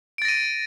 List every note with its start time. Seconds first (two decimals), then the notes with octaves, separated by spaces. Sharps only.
0.18 D7
0.22 A6
0.25 A#6
0.28 D#7